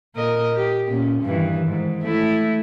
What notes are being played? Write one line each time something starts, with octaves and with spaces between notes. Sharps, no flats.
A#2 A#4 D#5
G4
A#2 C#4
G2 D#3 E3
G#2
A3 E4